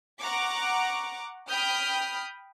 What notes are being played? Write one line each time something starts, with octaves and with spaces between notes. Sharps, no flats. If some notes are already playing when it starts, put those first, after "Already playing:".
F#5 A#5 C#6 D6
G5 B5 D#6 F6 G6